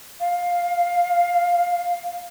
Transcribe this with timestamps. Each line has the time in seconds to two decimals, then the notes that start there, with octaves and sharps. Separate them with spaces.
0.20 F5